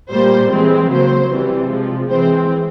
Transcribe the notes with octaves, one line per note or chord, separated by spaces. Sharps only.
A#2 G3 A#3 C5
E3 G#3 C4
C#3 F#3 A#3 C5
C3 E3 G3 C4
C3 F3 G#3
E3 G#3 C4 C5